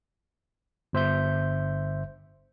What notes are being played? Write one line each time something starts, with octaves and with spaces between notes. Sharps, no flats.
G1 C5 E5 G6